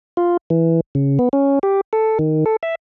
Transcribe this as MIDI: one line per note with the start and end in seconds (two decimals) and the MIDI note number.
0.17 0.37 65
0.50 0.80 52
0.95 1.19 49
1.19 1.29 59
1.33 1.59 61
1.63 1.81 67
1.93 2.18 69
2.19 2.45 51
2.46 2.56 69
2.63 2.75 76